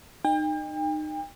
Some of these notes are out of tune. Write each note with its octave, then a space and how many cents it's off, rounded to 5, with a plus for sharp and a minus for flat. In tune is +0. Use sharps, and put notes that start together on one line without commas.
D#4 -25 G5 +40